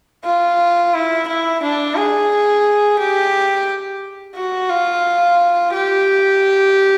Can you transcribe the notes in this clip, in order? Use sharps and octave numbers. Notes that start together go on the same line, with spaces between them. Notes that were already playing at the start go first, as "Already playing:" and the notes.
F4
E4
E4
D4
G#4
G4
F#4
F4
G4